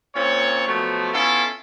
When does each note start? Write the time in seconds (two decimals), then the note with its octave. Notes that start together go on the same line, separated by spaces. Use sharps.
0.15 A#2 A#3 C4 C#4 C#5
0.67 B2 F3 F#3 A3
1.14 B3 C#4 E4 F4 A4